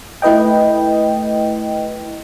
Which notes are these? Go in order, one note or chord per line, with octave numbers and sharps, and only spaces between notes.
A3 E4 B4 D#5 G5